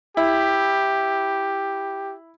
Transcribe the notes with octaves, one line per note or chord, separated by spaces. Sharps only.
E4 G4